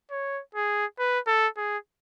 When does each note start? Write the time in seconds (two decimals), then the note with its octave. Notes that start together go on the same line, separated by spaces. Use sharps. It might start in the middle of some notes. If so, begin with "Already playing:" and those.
0.11 C#5
0.55 G#4
0.99 B4
1.27 A4
1.57 G#4